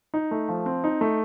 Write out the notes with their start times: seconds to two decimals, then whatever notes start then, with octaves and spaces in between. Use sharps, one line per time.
0.14 D#4
0.31 A3
0.49 F3
0.66 C4
0.84 D#4
1.01 A3